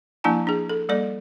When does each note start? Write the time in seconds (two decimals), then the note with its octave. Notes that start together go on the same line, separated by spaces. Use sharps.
0.24 F3 A#3 D4 E4 G#5 A5
0.47 D4 G#4
0.70 A4
0.89 G3 A#3 A4 D5